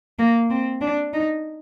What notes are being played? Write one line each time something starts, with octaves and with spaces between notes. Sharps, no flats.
A#3
C4
D4
D#4